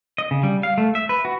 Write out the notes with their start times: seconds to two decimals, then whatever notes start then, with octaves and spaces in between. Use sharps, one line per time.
0.18 D#5
0.31 C#3
0.43 G3
0.63 F5
0.78 A3
0.95 E5
1.09 B4
1.25 F#4